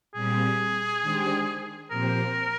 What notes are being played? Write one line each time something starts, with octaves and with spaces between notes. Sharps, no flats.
A#2 G3 C4 G4 G#4
D#3 G#3 D4 G4 C5
A#2 F3 C4 G4 A#4 C5